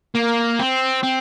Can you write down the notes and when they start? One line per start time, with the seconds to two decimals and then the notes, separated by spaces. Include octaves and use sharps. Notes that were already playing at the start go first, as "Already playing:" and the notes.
0.15 A#3
0.59 C4
1.03 C4